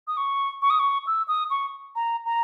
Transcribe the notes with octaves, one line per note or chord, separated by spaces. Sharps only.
D#6
C#6
C#6
D#6
C#6
E6
D#6
C#6
A#5
A#5